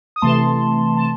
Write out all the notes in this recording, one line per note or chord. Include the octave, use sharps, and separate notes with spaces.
D#6
C3 E3 A3 A5 C6
A5